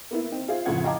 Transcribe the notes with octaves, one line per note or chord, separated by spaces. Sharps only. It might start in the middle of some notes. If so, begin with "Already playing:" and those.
A#3 B3 E4
C4 D#4
F4 G#4 C5 E5 F5
A1 F2 C#3 F3 F#5 G#6
D#5 F5 G5 A5 A#5 D6